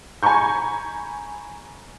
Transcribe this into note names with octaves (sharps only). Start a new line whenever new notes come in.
G#5 A#5 B5 C#6 G6